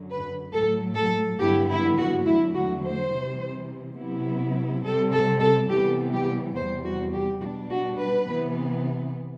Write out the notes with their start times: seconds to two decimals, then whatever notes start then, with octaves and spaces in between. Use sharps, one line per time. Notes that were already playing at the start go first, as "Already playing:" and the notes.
Already playing: F#2 D3 F#3
0.11 B4
0.53 A2 F#3 A3 A4
0.96 A4
1.39 G2 D3 F#3 B3 E4 G4
1.68 E4
1.97 F#4
2.25 E2 D3 F#3 A3 E4
2.53 F#4
2.83 C5
3.11 C3 E3 G3
3.97 C3 F#3 B3 E4
4.83 C3 G3 C4 A4
5.12 A4
5.41 A4
5.70 C3 E3 G3 B3 G4
6.13 G4
6.55 E2 C3 G3 C5
6.84 F#4
7.13 G4
7.41 B2 G3 D4 F#4
7.70 F#4
8.00 B4
8.28 C3 E3 B3